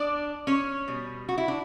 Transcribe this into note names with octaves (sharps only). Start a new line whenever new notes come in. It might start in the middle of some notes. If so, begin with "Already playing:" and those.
Already playing: D4 D5
C#4 C#5
B2 G3
F#4
E4
D4